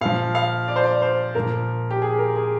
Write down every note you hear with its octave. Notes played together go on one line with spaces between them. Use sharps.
A#2 F3 F5
F5
D5
C5
D5
C5
A#2 F3 A#4
G4
G#4
A#4
G#4